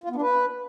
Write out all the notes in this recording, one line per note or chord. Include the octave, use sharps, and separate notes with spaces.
F4
B3
D4
B4